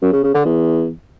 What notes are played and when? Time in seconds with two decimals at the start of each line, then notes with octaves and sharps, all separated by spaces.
0.02 F#2
0.13 C#3
0.23 C#3
0.34 D3
0.45 E2